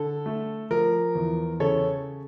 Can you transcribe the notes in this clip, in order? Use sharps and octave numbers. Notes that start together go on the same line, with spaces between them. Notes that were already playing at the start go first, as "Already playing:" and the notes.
Already playing: D3 A4
A3
F3 A#4
E2
C#3 A4 C#5